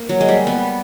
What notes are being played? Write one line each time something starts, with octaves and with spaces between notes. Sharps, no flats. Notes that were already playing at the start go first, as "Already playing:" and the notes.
Already playing: A#3
F#3
G#3
G3
B3